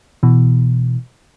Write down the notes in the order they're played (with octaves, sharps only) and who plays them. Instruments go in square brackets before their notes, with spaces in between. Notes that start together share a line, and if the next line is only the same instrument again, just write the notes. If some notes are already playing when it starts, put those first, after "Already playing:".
[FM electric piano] B2 E3